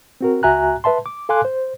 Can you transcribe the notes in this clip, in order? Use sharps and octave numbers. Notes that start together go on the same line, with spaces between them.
C4 F#4 A#4
C#2 F#4 E5 G#5 A#5 F#6
B4 E5 A5 C6
D6
A4 F5 G#5 C6 D6 F#6
C5